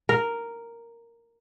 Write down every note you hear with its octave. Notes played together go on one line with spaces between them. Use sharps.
A#4